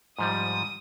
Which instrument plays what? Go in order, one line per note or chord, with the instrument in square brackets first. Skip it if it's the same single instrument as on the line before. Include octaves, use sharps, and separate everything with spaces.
[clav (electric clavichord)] G#2 F3 G3 [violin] D#6